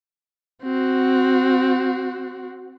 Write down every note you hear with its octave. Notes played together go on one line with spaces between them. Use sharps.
C4 F#4